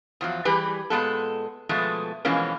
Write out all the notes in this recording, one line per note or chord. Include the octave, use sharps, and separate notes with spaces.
E2 F3 F#3
E3 G3 G4 G#4 B4
A#2 G#3 B3 A4
B2 F3 G#3 A3 B3
B2 E3 F3 G#3 A#3 C#4